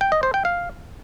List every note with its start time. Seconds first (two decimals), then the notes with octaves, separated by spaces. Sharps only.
0.01 G5
0.12 D#5
0.23 C5
0.34 G5
0.45 F5